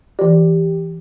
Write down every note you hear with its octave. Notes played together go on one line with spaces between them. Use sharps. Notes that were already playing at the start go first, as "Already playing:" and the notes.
E3 G4 D5